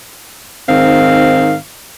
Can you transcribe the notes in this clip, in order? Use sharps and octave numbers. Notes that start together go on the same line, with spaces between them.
G#2 D#3 C4 F5